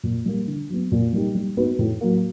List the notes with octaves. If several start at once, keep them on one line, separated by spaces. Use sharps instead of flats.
A#2
G3 A#3
D3
F#3 B3
A#2
G3 A#3 D#4 G4
G3
B3 D#4 F#4 B4
A2
F#3 A#3